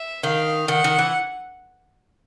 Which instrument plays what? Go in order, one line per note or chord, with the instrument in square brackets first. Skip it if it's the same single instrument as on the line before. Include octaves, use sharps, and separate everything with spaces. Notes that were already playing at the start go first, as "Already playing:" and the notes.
Already playing: [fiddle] E5
[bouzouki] D#3 [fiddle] F5
[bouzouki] D#3 [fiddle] F#5
[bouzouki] D#3
E3